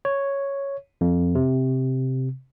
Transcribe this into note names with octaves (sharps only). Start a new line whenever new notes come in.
C#5
F2
C3